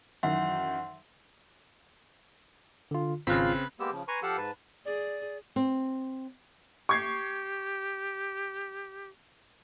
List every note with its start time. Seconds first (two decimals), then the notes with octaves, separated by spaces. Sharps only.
0.23 F#2 D#3 E3 E5 F#5 C6
2.91 D3 F4
3.27 G#1 C#3 C4 F4 B4 B5
3.80 G#3 A#3 B3 G4 E6
3.92 C#3 F3
4.08 B4 G#5 A#5 C6 C#6
4.23 F3 G4 A4 F5 F#5 E6
4.37 G#2 B4 A5
4.85 G#4 D5
5.56 C4
6.89 G4 C#6 G#6 C7